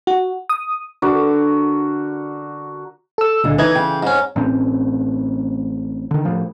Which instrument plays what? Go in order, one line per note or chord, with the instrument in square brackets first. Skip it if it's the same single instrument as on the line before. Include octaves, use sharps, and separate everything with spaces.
[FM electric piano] F#4
D#6
[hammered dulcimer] D3 F#4 A#4 D6
[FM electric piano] A4 E6
[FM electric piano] C#2 D3 [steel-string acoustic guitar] A#2 G#3 A4
[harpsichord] E3 [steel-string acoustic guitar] D#4 [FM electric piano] B4 D#5 G#6
[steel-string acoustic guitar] C#3 [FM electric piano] G5
[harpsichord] G#2 C#4
[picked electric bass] A1 A2 C4 C#4
D3 D#3
A2 F3